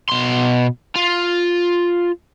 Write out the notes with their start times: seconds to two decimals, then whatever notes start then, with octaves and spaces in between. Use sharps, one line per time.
0.10 B2 C6
0.96 F4